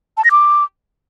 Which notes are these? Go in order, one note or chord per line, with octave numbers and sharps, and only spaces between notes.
A5
A#6
D6